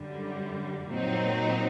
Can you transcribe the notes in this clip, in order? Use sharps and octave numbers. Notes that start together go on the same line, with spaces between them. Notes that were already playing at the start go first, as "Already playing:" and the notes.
Already playing: F#2 D3 G3
A#2 F#3 C4 D#4